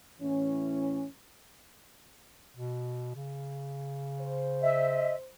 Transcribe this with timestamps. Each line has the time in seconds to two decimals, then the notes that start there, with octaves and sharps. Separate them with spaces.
0.21 A2 E3 C#4
2.57 B2
3.16 C#3
4.20 C5
4.61 D#5 E5